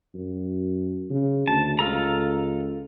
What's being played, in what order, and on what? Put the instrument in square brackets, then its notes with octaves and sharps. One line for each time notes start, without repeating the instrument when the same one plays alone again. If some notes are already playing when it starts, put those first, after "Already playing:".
[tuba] F#2
C#3
[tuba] D2 [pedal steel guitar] A5
[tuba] C#2 [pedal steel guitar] F4 A4 A#5